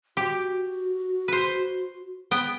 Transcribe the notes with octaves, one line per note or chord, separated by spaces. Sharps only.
F#4 G4
B4 C5
B3 G5